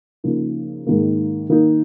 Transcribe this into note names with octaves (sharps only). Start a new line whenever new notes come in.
C#3 F3 A#3 D#4
G#2 D#3 A#3
D#3 A#3 D#4